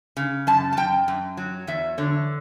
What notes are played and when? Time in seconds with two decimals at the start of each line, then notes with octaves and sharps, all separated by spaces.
0.17 C#3
0.47 F#2 A5
0.73 A5
0.77 F#2 G5
1.08 F#2
1.37 F#3
1.67 E2 E5
1.98 D3 C#5